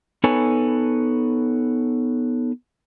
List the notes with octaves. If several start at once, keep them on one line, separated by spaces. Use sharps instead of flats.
B3 D#4 A4 B4 C#5 G#5